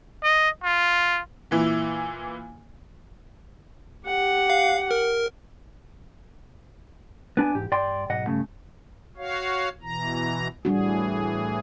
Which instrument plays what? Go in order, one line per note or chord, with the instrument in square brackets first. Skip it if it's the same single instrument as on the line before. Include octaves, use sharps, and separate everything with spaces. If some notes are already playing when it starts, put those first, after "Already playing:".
[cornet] D#5
F4
[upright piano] A#2 E3 E4
[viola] G4 F#5
[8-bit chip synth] F5
A#4
[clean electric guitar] B3 D4 G#5
E2 G#2 G4
G2 D5 G5 C6
B1 G#2 D#5 F#5
G2 C#3 A3
[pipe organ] F#4 C#5 F5
B2 E3 A#5
[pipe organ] A2 E3 G#4 [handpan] G3 D4 F#4